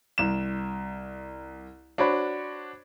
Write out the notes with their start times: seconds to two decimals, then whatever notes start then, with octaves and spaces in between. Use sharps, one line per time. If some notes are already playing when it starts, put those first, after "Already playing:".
0.18 C2 E7
1.98 D4 F#4 C5 C#5 B5